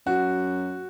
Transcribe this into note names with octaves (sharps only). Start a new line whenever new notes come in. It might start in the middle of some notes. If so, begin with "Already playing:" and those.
F#2 F#4